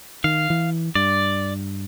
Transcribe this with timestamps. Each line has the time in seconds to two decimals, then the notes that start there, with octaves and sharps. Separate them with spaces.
0.24 D#3 F5
0.50 E3
0.95 G2 D5